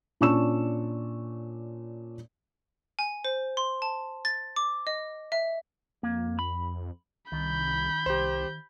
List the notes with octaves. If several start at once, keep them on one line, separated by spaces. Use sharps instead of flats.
A#2 C#4 D4 C#6 E6 E7
G#5
C5
C6
A5
A6
D6
D#5
E5
F2 A#3
B5
C2 D#3 B5 G6
C2 G4 C5